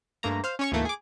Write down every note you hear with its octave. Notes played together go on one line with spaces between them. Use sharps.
G2 A3 A#3 A#5
C5 F5
C#4 C#5 C#6
D2 G#2 E3 A3 A#3
G#4 D6